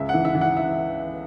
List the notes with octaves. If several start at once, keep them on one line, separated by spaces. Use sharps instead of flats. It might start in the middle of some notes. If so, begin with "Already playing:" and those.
Already playing: C#2 E5
F#5
E3
E5
E3
F#5
E5